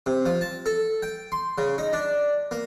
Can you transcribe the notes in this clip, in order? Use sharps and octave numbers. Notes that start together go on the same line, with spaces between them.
C3
F3
A5
A4
G5
C6
C#3
D#4
D4
A#3